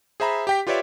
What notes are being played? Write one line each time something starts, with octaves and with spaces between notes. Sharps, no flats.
G#4 C5 E5 A#5 B5
G4 G5 B6
F4 G4 B4 C#5 D5 E5